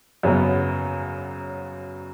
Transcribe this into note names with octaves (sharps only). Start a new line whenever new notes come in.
F#2 C#3 F#3 B3